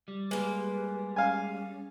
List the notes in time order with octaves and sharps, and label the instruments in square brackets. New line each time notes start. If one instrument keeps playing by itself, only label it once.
[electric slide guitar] G3
[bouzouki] G#3 A#3 [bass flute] B4
[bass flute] C#4 [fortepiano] F5 G#5